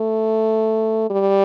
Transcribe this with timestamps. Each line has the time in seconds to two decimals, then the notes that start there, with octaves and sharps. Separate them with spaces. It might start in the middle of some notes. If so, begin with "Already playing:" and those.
Already playing: A3
1.10 G3